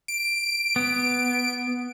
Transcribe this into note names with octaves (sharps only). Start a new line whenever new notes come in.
D7
B3